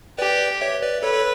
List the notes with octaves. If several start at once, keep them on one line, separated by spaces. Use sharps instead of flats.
G4 B4 D5
C#5 E5
B4 D5
A4 B4 C#5
A4 C#5